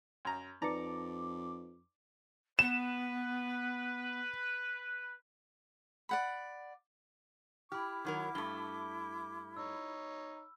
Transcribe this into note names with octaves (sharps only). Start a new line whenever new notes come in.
F#2 A#5
F2 D#4 B4 D5 A5 A#5 D6 C#7
B3 B4 E7
D5 F#5 B5
E4 G4 B5 D6 F6
D#3 F#3 A#4
G2 A3 G7
D#4 C#5 E6